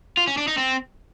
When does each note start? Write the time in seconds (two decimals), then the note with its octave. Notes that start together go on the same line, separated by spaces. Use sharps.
0.17 F4
0.27 C#4
0.37 D4
0.48 D#4
0.58 C4